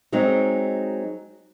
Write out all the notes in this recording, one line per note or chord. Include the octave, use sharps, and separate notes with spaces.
F#3 G#3 C4 D#4